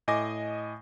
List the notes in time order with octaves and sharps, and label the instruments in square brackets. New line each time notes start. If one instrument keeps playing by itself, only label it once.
[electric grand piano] A2 D#5 G#5 D6 A#6